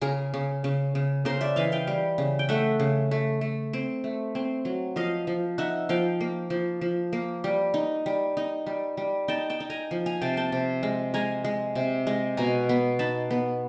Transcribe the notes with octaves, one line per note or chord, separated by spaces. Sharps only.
C#3 G#4 A#4
C#3
C#3
C#3
C#3 A#4 C5
D5 E5
E3 D#5 F5
F5 G5
G3
C#3
G5
A3 E5 F#5
C#3
A3
A3
C4
A3
C4
F#3
F3 D#5 F5
F3
D#4 E5 F#5
F3 F5 G5
A#3
F3
F3
A#3
G3
D#4
G3
D#4
G3
G3
D#4 G5 A5
G5 A5
D#4
G#5 A#5
F3
G#5 A#5
C3 G5 A5
G5 A5
C3
G#3
G#3 G#5 A#5
G#3
C3
G#3
B2 G#5 A#5
B3
D#4 A5 B5
B3